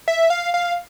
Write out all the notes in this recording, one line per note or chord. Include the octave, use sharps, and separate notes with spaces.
E5
F5
F5